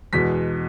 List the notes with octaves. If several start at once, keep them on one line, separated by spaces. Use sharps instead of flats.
E2 B2 G#3 B6